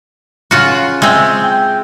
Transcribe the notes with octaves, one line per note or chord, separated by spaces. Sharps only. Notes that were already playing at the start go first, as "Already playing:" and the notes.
C#3 F4 F#4
G#3 C4 E5
G5